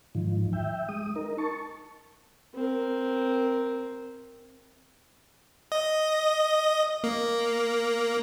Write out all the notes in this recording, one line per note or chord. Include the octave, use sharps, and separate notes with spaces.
G#2 D#3 F3
E5 G5
G#3 D#6
D#4 A#4
A5 C#6
C4 A#4
D#5
A#3